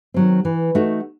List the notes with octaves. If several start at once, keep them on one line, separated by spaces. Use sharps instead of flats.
D#3 F#3 C4
E3
A3 D#4 F#4